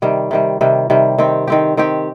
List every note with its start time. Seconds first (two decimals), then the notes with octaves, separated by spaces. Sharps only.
0.02 C3 D#3 G3
0.31 C3 D#3 G3
0.61 C3 D#3 G3
0.90 C3 D#3 G3
1.18 D#3 C4 G4
1.47 D#3 C4 G4
1.77 D#3 C4 G4